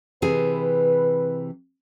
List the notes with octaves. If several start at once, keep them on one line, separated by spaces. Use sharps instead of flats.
C3 E3 G#4 B4